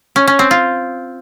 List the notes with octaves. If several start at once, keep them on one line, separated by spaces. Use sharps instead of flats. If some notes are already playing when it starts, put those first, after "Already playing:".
C#4
C#4
C4
F4